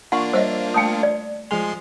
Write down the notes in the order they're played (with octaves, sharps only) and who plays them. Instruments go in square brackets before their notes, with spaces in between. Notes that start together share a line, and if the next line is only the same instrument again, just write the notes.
[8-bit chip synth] A#3 D4 F4 [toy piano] F#5 C6 [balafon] C#6
[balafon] G3 C#5 D#5 [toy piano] C5
[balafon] A3 [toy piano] G5 A5 D#6
[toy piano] D5
[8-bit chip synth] F3 G#3 C6 [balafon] G#4 G#5